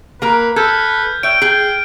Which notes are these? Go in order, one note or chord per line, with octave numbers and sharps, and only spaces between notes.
A#3 A#4 B4
A4 B4 F6 G6 G#6
C#5 E5 G5 D7
G#4 G5